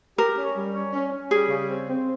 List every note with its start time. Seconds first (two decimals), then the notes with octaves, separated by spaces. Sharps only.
0.18 G4 A#4
0.37 C#4
0.55 G3
0.74 C#4
0.93 C#4
1.12 C#4
1.31 G3 G#4
1.49 C#3
1.69 C4
1.87 C4